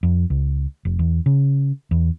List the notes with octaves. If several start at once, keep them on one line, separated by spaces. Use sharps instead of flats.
F2
C#2
F1
E2
C#3
E2